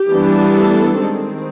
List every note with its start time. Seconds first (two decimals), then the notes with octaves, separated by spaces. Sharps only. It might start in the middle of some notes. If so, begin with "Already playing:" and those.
Already playing: G4
0.11 E3 G3 B3 D4
0.53 A3 A4
0.97 D#3 G#3 C4